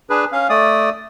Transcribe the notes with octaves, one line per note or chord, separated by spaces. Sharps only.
D4 G#4 B4
C#4 F5
A3 D5 D#6